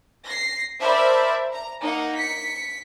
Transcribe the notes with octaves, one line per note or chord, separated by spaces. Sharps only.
A#6 C7
A#4 C5 D5 E5 A5 B5
A#5
A#3 D#4 F#5
B6 C#7